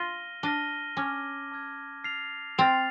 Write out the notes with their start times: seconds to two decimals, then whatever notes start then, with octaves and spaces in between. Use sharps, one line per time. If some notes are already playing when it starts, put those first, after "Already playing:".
Already playing: F4 F6 A#6 D#7 G7
0.43 D4 F6 A#6 D#7 G7
0.97 C#4 A5 D6 F6 G#6
1.51 A5 D6 F6 G#6
2.04 F6 A6 C7 F7
2.58 C4 F6 A6 C7 F7